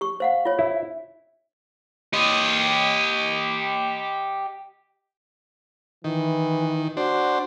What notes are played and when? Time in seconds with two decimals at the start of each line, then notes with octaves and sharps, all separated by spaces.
0.01 G4 C#6
0.20 C5 F5 F#5
0.45 F4 C#5
0.59 E4
2.13 G4 D#5
6.04 D#3 E3
6.97 D4 F#4 C5